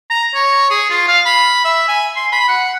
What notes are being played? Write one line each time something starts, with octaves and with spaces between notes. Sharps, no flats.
A#5
C#5
G#4
F4
F5
B5
E5
G#5
C6
B5
F#5